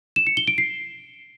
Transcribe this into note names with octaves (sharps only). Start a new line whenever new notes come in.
E7
C#7
G7
D7
C7